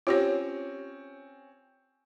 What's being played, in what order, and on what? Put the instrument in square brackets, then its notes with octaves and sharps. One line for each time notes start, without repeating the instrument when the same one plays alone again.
[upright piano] C4 C#4 [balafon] F4 G4 C#5